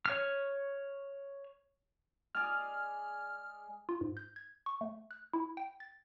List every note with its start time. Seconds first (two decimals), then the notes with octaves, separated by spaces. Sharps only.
0.06 C#5 F6
2.35 G#3 G#4 D5 F6
3.89 F4
4.01 G#2
4.17 G6
4.36 G#6
4.66 C#6
4.81 A3
5.11 F#6
5.33 E4
5.57 G5
5.80 A6